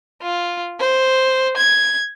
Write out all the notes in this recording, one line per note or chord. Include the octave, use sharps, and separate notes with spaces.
F4
C5
G#6